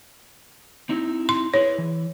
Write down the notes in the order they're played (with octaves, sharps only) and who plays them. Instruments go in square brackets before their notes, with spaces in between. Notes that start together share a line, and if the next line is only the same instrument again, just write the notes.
[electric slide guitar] C4 D#4 E4
[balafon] C6
[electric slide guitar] E4 G#4 B4 [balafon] C#5
[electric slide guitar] E3